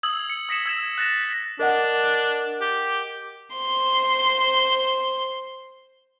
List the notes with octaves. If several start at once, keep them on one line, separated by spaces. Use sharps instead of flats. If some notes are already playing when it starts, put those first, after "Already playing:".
D#6 E6 G#6 F#7
C#7
D#6 A#6 B6 C#7 E7
E6 G#6 E7
F#6 A6 A#6 E7
A#6 B6
D4 A#4 D#5 F#5
G4
C5 C6